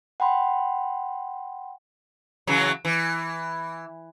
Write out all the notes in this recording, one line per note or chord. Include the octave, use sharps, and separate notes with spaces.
F#5 G5 B5 C6
C#3 E3 F#3
E3